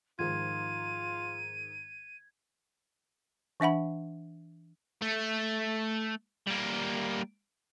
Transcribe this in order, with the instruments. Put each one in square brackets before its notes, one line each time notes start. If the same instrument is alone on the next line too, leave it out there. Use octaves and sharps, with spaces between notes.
[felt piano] G#2 D#3 F3 [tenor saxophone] F4 [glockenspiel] G#6 [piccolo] D#7
[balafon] E3 D4 E5 F#5 B5
[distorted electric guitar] A3
G3 A#3